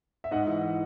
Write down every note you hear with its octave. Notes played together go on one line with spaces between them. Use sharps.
E5
G#2 D#5 F#5
E3